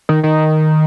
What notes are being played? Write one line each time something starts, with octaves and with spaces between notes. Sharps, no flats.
D#3
D#3